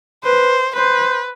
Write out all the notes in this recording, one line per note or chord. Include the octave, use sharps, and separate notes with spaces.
B4 C5
B4 C5